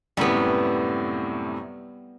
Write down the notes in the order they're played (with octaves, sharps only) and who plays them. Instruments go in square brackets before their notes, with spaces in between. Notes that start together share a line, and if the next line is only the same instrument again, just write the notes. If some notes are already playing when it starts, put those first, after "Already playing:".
[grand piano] F#2 A2 C3 [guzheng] G3 B3